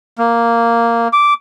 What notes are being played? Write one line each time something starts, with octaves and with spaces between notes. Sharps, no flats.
A#3
D6